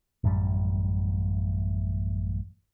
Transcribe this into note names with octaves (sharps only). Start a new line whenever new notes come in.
A1 F#2 G3